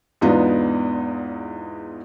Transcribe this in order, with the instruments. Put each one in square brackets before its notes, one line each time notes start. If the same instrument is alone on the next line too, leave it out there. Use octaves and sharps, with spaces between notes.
[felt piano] E2 G#2 B3 D4 D#4 F4